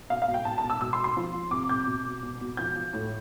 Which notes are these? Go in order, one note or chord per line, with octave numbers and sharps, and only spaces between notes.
B2 F5
F5
B2
G5
B2 A5
A5
B2
E6
B2 E6
C6
B2
C6
F3
F3
C3 D6
C3 G6
B2
B2
B2
B2
F3 G6
F3
A2